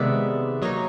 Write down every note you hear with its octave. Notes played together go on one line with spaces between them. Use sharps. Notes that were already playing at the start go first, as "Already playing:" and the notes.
Already playing: C3 D#3 G#3 B3 D5 E5
F#3 A#3 D#4 C#5 D#5